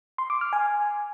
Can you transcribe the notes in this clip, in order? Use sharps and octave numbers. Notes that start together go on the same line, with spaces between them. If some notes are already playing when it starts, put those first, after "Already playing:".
C6
D6
F6
G#5